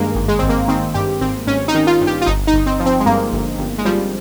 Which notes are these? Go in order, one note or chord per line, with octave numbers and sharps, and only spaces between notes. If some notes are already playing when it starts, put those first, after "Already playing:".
Already playing: G2 D#3 G#3 A#3
G#1
G#3
G#1 C4
A#3
D#3 C4
G2 G4
G#1 C4
G#1 C#4
D#4
D#3
F4
G2
G4
F4
G1 D#4
D#4
G1
C4
F3
C4
G#3
G2 A#3
G1
G1
G#3
F3 G3